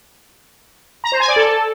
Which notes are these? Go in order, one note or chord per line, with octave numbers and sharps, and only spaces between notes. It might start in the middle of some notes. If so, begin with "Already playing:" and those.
A#5
C5
G#5
D5
A4